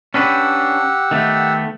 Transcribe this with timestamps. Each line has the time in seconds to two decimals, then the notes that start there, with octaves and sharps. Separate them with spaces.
0.14 C#4 D4 G4 B4 F#5 E6
1.11 D#3 A3 B3